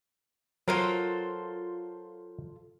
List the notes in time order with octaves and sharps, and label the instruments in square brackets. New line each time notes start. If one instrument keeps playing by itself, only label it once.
[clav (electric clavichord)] F#3 A#4 [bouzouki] F4 A4 C5